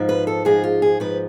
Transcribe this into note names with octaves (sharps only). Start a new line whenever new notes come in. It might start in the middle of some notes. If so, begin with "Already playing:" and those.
Already playing: G#2 F3
B4
A4
G#2 F3 G#4
F4
G#4
G#2 F3 B4